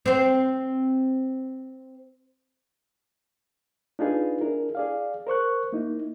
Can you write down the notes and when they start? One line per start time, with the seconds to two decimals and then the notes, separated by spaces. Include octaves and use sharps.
0.06 C4 C5
3.99 D4 D#4 F4 G#4 B4
4.41 D4 E4 G#4 A#4
4.75 G#4 D5 F5
5.27 A#4 C5 C#6 F#6
5.73 A#3 D#4 E4